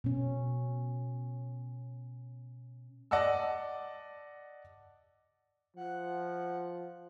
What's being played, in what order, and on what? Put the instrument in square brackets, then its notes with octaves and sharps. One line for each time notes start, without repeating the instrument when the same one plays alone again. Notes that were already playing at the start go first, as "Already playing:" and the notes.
[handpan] B2 C#4
[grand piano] D5 D#5 F#5 A5 E6
[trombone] F3 [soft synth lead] F#5